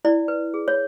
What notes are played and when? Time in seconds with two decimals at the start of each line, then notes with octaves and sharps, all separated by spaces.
0.05 E4 D5
0.28 B4
0.54 G#4
0.68 C#5